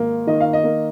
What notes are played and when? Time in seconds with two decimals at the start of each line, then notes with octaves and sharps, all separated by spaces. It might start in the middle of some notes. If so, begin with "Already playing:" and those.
Already playing: G#1 A#3
0.27 D#3 D#5
0.40 F5
0.53 D#5
0.64 A#3